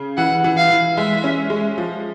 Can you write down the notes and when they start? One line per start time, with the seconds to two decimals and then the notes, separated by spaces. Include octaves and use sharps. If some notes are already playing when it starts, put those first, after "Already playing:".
Already playing: C#3
0.17 E3 F#5
0.44 E3
0.58 F5
0.70 E3
0.97 G#3 E5
1.24 C#4
1.50 G#3
1.78 F3